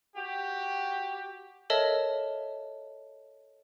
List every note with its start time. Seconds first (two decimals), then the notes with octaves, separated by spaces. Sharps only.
0.15 F#4 G4
1.70 A4 A#4 C#5 D#5 E5 A5